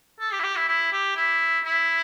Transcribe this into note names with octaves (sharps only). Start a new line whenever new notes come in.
A4
G4
E4
G4
E4
E4
G4
E4
E4